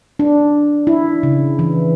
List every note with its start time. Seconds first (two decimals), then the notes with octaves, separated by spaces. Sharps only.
0.19 D4
0.87 E4
1.23 C#3
1.59 E3